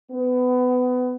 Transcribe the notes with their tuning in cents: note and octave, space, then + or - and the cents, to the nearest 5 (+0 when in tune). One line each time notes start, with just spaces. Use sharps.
B3 +25